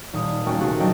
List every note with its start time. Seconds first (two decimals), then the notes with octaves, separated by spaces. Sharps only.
0.13 D#1 D#6
0.46 A3 A#3 C#4 F#4 G5 G#5
0.60 C3 A3 F#4 G#4
0.80 B1 F#3 D4 D#5 G5 A5